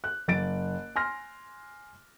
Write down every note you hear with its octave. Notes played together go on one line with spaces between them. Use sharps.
F#6
F#1 A6 D7
G#5 C6 F6 A#6